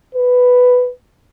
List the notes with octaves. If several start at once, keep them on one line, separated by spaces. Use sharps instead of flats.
B4